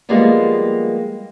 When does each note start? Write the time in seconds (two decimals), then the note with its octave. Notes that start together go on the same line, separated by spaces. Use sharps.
0.09 F3 G3 G#3 A#3 B3